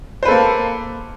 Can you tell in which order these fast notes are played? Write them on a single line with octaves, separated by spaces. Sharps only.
C5 B4 A4 A#3